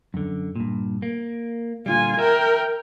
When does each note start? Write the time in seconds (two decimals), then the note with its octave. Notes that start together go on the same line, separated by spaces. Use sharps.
0.14 F#2 D3
0.56 G2 A#2
1.02 A#3
1.86 A#2 D3 G3 F4 G#5
2.19 A#4 E5 G5